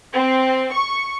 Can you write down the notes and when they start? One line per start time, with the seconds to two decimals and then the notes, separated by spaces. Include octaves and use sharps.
0.14 C4
0.73 C#6